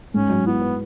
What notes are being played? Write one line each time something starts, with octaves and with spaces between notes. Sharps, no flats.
G#2 C#4
F#3
B3 E4
B4